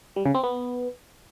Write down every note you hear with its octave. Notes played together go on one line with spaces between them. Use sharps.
G3
C#3
C4
B3